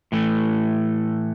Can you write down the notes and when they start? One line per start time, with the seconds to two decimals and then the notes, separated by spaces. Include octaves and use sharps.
0.12 A2 E3 A3